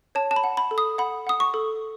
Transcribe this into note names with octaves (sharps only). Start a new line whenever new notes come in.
C#5 A5
A5
B5
F#5
B5
A4
D#6
F#5 B5
F#5 D#6
C#6
A4